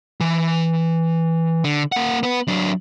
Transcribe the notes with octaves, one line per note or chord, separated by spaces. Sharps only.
E3
D3
A#3 F#5
B3 B4
F#3 D4